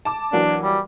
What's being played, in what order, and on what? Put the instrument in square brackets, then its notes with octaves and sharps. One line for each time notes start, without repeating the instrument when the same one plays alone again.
[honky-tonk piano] A5 D6
[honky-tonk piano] E3 F#3 A#3 [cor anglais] D4
[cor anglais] G3